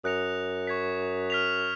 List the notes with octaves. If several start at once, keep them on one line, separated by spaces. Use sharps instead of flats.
F#2 D#6 F#6 A#6 C#7 F7
C#6 G#6 B6
F6 B6 F7